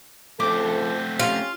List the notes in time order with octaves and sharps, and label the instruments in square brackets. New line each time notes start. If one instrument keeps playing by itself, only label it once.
[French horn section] C#3 F3 A4 [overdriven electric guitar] A3 C4 [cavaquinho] D6
[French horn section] C#4 G4 [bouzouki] F4